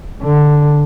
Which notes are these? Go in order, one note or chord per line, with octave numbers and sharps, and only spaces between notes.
D3